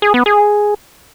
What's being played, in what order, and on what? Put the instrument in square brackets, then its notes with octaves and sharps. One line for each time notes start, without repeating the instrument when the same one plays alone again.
[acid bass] G#4
B3
G#4